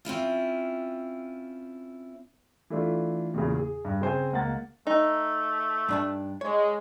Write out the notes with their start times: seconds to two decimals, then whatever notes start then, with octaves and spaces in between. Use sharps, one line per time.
0.05 C4 C#4 E4 F4
2.70 E3 A3 D4 F4
3.34 E2 A#2 C#3
3.55 G#4
3.85 G2
4.01 C#3 C4 C5 G#5
4.32 C#2 A#3 F#5 A6
4.87 A3 D#4
5.89 G2 D4 A5
6.41 G#3 C#5